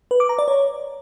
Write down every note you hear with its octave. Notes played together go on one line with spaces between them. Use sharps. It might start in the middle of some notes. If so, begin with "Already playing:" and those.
B4
D6
A#5
D5
C#5